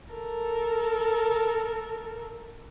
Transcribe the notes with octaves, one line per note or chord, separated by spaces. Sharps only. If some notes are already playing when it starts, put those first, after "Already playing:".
A4 A#4